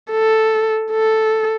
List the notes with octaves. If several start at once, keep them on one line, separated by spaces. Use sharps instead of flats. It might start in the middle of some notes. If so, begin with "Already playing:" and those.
A4
A4